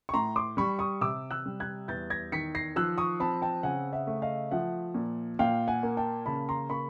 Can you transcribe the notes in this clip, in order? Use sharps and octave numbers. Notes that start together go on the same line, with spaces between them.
C#6
A2 A#5 C6
C6 D6
G3 B5 C#6
C#6 D#6
C3 D6 E6
E6 F#6
G3
F#6 G#6
E2 G6 A6
G#6 A#6
D#3 B6 C#7
A#6 C7
F3 E6 F#6
C#6 D#6
C4 A5 B5
G5 A5
C#3 F#5 G#5
E5 F#5
A3
D#5 F5
F3 E5 F#5
A#2
A#2 F5 G5
F#5 G#5
A#3
G5 A5
C#3 A5 B5
A#5 C6
A#3 B5 C#6